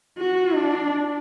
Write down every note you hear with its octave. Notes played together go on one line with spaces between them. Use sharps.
F#4
D4